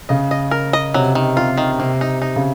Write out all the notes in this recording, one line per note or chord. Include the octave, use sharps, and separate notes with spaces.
C#3 D#5
D#5
A#4
D#5
C3 F#3
D#3
C3 F4
D#3
C3 A#3
D#4
D#4
C#3